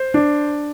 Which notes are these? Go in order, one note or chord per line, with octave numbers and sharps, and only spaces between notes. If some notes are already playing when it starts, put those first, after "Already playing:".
Already playing: C5
D4